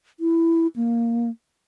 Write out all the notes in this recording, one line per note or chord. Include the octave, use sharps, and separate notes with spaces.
E4
A#3